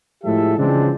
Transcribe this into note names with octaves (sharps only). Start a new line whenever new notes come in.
A2 F3 G#3 G4 A4 E5
C#3 E3 F3 G#3 C4 D4